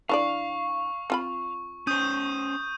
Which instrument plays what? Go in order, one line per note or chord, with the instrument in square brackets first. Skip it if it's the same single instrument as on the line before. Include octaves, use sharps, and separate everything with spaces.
[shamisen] E3 D4 D5 [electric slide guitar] F5 [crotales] C#6
[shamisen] C4 F4 B5
[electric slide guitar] C#4 C5 [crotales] D#6 G6 D#7